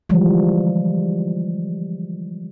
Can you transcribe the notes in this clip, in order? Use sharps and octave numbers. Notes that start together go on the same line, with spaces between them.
D3 E3 F3 G3 G#3